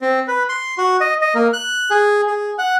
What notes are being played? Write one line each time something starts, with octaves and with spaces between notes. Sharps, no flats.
C4
B4
C6
F#4
D#5
D#5
A#3
F#6
G#4
G#4
F#5